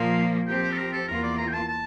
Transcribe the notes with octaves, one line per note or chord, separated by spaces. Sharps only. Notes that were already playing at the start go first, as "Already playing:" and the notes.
Already playing: A#2 F3 A#3 F5
F3 C4 G4 G5
C5
A4
A#4
A4
E2 E3 A#3 F4 A#4
D5
A#5
G5
A5
A5